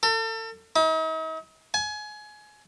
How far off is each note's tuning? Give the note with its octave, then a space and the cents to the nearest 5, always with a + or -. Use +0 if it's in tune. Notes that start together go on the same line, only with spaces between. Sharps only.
A4 +35
D#4 +45
G#5 +25